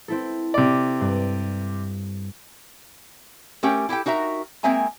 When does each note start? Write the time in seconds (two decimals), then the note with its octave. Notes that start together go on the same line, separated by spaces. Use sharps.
0.08 C4 E4 A4
0.54 C3 D5
1.01 G2
3.63 A3 C#4 G4 A#4 G5
3.89 E4 G4 A4 G5
4.06 D#4 F#4 A#4 E5 A#5
4.63 G#3 A#3 C4 E5 G#5 A#5